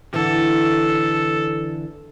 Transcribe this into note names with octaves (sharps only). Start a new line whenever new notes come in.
D3 E3 A4